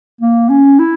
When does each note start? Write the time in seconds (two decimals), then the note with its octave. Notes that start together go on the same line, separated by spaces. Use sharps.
0.21 A#3
0.49 C#4
0.79 E4